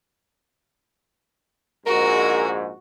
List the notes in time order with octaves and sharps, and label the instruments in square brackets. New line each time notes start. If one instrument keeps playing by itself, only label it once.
[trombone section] A#1 G#2 [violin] F#4 [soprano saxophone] A#4